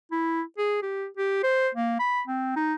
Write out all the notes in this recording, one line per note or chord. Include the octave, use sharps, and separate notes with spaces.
E4
G#4
G4
G4
C5
A#3
B5
C4
D#4